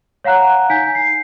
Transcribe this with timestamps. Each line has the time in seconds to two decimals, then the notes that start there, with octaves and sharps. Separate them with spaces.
0.24 C#5 F5 F#5 A#5 F#6
0.70 D#4 G#5 G6 B6
0.95 C7